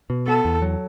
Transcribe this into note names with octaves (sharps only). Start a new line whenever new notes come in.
B2
B3 A4
E2
F#3